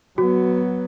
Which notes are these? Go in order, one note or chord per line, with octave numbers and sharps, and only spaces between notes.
F#3 B3 F#4